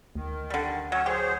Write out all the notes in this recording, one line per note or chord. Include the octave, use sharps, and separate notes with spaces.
D2 D#3
D3 G3
F#3 C#4 C#5
F#3 G4 G#4 C5 C#6